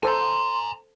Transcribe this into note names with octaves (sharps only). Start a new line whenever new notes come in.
A4 C5 G#5 A#5 C6